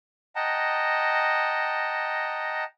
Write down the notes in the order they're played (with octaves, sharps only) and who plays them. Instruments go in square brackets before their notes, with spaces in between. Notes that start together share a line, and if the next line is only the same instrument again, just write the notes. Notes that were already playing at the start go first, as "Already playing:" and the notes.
[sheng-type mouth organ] D#5 F#5 G5 A5 A#5